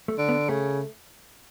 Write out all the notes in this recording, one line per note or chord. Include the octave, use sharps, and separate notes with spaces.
A3
D3
B3
C#3 A3